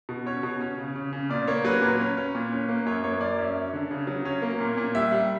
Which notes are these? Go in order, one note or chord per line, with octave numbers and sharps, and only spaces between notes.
B2
C#4 C#5
B2
C#4
C#3
C#3
C#3
A#2 D5
A#3 C#5
F#3 B4
A#2 B4
C#4
C#4
A#2
C#4
A#3
F#2 C#5
A#3 C#5
F#2 D5
C#4 E5
C#4
D3
C#3
F#3
C#4
A#3
A#2
A#2
G3 E5
G3